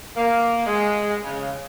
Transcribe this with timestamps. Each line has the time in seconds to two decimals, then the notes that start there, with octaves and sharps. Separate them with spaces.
0.17 A#3
0.66 G#3
1.23 C#3